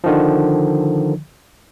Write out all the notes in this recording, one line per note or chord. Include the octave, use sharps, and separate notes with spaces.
D3 D#3 F3